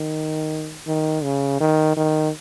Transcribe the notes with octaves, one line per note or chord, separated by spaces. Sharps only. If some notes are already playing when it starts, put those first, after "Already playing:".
Already playing: D#3
D#3
C#3
D#3
D#3